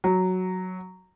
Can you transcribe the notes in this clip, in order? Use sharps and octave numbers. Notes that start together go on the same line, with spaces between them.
F#3